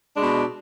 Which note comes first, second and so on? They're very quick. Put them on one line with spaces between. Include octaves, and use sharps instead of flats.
D4 G#3 B2